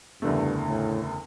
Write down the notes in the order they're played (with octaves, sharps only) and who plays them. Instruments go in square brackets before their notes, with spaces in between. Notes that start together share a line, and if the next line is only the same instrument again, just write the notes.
[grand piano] F#1 E2 D3 A3 [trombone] G2
[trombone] A2